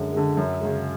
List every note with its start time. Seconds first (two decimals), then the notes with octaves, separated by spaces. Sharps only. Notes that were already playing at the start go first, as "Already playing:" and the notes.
Already playing: F#2 D3 G#3
0.13 D3 G#3
0.37 F#2
0.61 C#3 G#3